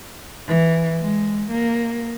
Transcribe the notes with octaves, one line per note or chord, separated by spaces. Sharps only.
E3
G#3
A#3